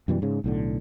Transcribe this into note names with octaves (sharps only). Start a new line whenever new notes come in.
F#2 B2 E3 G3
G#2 C#3
B1 A2 D3